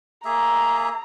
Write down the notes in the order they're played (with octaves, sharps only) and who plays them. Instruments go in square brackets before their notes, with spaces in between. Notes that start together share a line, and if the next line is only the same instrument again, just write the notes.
[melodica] A#3 G#4 E5 [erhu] A#5